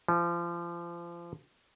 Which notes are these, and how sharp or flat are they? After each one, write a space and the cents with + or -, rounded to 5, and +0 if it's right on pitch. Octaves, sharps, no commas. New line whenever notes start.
F3 -30